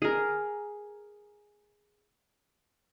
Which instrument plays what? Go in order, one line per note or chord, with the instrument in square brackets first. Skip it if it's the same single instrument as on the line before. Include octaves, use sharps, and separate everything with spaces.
[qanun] G#4 A#4